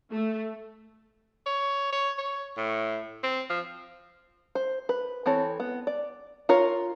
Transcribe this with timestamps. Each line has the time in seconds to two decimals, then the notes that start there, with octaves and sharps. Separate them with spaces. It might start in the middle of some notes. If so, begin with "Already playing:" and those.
0.12 A3
1.46 C#5
1.92 C#5
2.18 C#5
2.57 A2
3.23 C4
3.50 F3
4.55 C5
4.89 B4
5.26 E3 C4 A4 C#5
5.60 B3
5.87 D5
6.49 F4 A#4 C#5